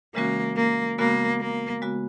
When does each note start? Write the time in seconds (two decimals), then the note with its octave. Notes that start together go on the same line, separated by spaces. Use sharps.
0.15 C#3 E3 G#3 A#3 C#4 F#4
0.57 A#3
0.98 C#3 G#3 A#3 B3 F#4
1.40 A#3
1.82 C#3 G#3 B3 F#4